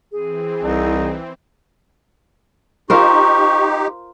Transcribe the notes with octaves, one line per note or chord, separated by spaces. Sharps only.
E3 C4 G#4
C2 D#4
D#4 F4 G4 A#4 C5 C#6